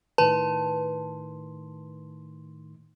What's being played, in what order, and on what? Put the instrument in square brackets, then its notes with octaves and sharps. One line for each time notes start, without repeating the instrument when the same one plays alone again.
[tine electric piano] A2 D#3 C6 [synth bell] B4 A5